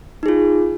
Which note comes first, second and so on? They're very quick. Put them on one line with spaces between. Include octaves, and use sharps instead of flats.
D#4 G#4 F4